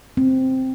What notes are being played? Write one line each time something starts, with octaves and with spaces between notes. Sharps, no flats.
C4